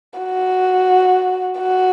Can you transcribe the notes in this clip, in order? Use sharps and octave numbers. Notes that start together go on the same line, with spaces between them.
F#4
F#4